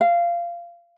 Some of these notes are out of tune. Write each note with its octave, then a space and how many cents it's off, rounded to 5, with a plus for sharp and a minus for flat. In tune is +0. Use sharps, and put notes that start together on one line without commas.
F5 -20